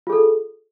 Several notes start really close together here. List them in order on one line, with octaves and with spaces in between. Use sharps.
F4 G#4 A4